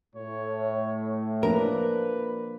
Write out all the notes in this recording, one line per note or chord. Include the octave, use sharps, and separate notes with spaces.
A2 C#5
F3 A#3 D4 A#4 B4